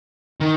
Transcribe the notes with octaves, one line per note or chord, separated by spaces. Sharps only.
D#3